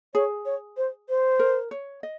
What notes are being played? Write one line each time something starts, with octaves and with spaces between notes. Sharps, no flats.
G#4 C#5
C#5
C5
C5
A#4
C#5
D#5